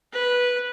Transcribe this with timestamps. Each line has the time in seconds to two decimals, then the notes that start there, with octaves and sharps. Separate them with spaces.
0.12 B4